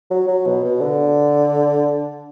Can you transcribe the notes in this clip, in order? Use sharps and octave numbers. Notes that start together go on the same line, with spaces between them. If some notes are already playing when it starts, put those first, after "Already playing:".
F#3
F#3
B2
B2
D3